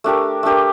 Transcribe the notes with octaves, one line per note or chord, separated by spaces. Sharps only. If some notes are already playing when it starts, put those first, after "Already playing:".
A3 D4 G4 A#4
A3 D4 G4 A#4